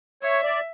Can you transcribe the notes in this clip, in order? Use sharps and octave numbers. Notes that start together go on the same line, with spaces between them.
C#5 E5
D5